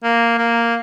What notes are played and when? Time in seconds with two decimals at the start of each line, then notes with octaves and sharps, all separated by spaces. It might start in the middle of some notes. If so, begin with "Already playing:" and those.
0.04 A#3
0.38 A#3